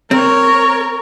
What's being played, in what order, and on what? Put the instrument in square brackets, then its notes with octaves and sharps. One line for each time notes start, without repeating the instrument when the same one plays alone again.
[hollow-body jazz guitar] C4 [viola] A#4 C#5